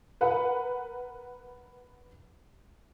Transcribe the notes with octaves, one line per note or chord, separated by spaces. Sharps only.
A#4 B4 F#5 B5